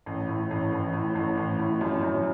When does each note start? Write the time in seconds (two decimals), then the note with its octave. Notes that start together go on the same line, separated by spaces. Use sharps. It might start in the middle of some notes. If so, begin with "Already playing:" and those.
0.06 A1
0.29 A2
0.51 A1
0.72 A1
0.93 A2
1.15 A1
1.37 A1
1.59 A2
1.81 F#2
2.03 F#2